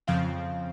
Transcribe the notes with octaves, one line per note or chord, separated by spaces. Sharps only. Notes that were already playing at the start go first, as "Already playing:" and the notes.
F2 C#3 F3 C4 F5